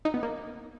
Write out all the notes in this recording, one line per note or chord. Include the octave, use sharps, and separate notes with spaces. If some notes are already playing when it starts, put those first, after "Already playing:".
D#4
B3
A#3